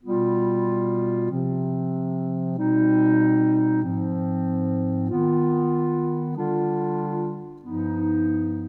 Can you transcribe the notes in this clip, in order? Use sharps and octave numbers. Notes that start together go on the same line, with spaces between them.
B2 G3 B3 F4
C3 F3 C4
B2 G3 C4 D#4
G#2 F3 C4
D#3 B3 F4
D3 G3 D4 F4
G2 F3 B3 D#4